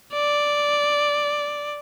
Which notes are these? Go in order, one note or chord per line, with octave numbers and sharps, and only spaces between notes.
D5